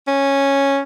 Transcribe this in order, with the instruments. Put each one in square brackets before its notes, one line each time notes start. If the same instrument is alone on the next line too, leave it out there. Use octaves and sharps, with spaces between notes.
[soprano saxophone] C#4